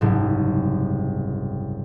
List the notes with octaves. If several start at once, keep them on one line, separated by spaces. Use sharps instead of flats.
F#1 C2 G#2